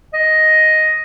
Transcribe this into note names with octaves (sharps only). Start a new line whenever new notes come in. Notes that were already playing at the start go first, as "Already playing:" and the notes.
D#5